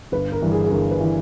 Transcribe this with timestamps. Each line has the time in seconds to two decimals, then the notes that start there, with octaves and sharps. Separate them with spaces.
0.12 G1 B4
0.32 A#4
0.42 G2 E3
0.52 G#4
0.64 G#4
0.71 G1 A#4
0.91 B4
1.00 E3